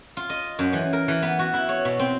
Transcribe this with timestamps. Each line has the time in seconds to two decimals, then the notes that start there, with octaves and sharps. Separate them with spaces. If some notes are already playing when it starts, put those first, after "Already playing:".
0.17 F4
0.30 D#5
0.59 F#2
0.73 E3
0.93 A#4
1.08 E3
1.23 B3
1.39 F#4
1.54 E4
1.69 C#5
1.85 B2
1.99 C4